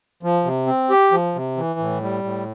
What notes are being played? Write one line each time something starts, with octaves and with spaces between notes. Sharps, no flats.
F3
C3
C4
G4
F3
C3
E3
A2
G3
A2